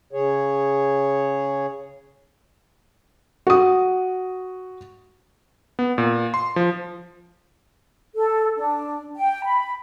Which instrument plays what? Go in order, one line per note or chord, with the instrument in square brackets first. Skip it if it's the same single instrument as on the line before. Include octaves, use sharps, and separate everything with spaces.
[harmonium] C#3 G#4 C#5
[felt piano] F#4 D#6
[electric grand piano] B3
A#2
C6
F3
[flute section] A4
D4
G5
B5